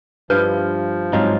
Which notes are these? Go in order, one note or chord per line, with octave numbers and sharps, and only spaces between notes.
G2 F3 E4 B4 F6 G6
G#2 F#3 C4 D#4 F4 C5 C#5